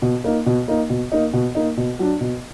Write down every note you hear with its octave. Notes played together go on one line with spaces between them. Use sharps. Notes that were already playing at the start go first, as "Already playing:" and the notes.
B2
A#3 D#4
B2
A#3 D#4
B2
A#3 D#4
B2
A#3 D#4
B2
F#3 D4
B2